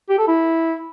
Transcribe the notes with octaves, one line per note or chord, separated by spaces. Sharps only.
G4
A4
E4